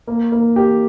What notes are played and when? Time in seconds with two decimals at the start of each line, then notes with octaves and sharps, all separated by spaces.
0.07 A#3
0.32 A#3
0.56 G4